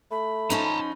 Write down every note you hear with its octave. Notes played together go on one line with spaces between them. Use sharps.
A3 B5
F3 C#4 D#4 A5 A#5